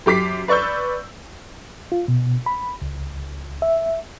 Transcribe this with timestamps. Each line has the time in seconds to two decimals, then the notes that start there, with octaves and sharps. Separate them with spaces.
0.06 F#2 G4 D6 B6 C7
0.48 B4 D5 C#6 E6 G6
1.92 F4
2.08 B2
2.46 B5
2.82 C#2
3.62 E5